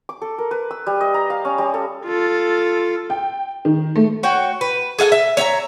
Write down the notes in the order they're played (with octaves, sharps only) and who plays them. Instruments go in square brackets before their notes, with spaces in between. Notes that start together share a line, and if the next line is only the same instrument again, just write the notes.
[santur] D6
A4
A#4
B4
E6
G3
D#5
A#5
F5
C#4
G3
A4
[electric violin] F4 A4
[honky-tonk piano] G5
D#3
A3
[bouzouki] F#4 C#5 G5
B4
G#4 A4 F5 G#5
E5
C#5 E5 G5 A#5